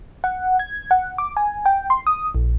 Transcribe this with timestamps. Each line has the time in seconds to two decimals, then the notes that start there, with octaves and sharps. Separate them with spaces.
0.24 F#5
0.59 G#6
0.91 F#5
1.18 D6
1.37 G#5
1.66 G5
1.90 C6
2.07 D#6
2.35 A#1